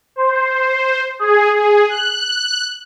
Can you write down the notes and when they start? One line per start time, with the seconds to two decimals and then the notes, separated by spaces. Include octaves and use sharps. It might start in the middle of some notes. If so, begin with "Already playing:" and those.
0.16 C5
1.19 G#4
1.53 G#4
1.88 F#6